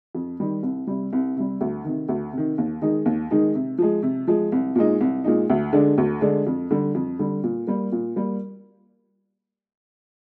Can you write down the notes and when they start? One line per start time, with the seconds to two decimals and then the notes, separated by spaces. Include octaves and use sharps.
0.15 F2
0.40 D#3 G3
0.63 C2
0.87 C3 G3
1.13 C2
1.37 C3 G3
1.61 D2
1.84 C3 D#3
2.09 D2
2.33 C3 D#3
2.58 D#2
2.82 D#3 G#3 D#4
3.06 D#2
3.31 D#3 G#3 D#4
3.55 C3
3.78 F3 G#3
4.03 C3
4.27 F3 G#3
4.52 C2
4.76 A#2 G#3 D#4
5.01 C2
5.24 A#2 G#3 D#4
5.50 D2
5.73 D3 G#3 D4
5.98 D2
6.21 D3 G#3 D4
6.47 F2
6.71 D3 G3
6.95 F2
7.19 D3 G3
7.43 A#2
7.67 G3 A#3
7.92 A#2
8.16 G3 A#3